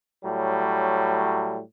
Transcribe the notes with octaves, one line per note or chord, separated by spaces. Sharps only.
A2 F#3 G3